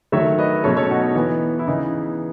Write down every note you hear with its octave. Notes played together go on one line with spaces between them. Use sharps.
D#3 F#3 A3 C#5 E5
B4 D#5
B2 F#3 A3 C#4 A4 C#5
A4 C#5
D#4 F#4
D#4
E3 B3
E4
C#3 E3 B3 D#4